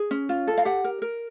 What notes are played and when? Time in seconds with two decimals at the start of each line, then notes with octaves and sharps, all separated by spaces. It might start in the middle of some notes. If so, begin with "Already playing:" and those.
Already playing: G#4
0.11 C#4
0.29 F4
0.48 A4
0.58 F5
0.65 G4 F#5
0.84 A#4
1.02 A#4